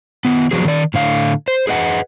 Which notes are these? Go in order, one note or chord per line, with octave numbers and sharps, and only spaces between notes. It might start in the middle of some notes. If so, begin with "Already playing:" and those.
D#3 B3
F3 F#3 B3 G#4
D#3 D5
A2 D3 F5
C5
G#4 B4 D#5 F#5